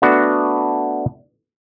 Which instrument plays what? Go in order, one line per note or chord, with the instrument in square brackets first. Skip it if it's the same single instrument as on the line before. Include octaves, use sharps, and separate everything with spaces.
[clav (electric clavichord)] A3 B3 D4 F#4 A4